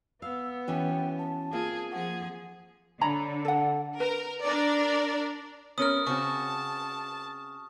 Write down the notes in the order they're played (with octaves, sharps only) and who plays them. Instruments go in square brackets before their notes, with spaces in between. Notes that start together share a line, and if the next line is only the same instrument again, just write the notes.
[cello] B3 [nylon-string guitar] F5 [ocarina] E6
[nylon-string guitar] E3 C#4 F#4 [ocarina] G5
[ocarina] A5
[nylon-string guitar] A#3 C4 F4 [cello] G#4
[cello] F3 G#4 [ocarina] F#5
[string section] D3 [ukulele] C#5 A#5 B5
[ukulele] A4 F#5
[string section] A#4 [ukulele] B4
[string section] D4 A#4 D5
[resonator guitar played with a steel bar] B3 C#4 A#4 [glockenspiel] D#6 F6
[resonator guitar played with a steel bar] C#3 C4 F#4 [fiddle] A5 [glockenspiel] C#6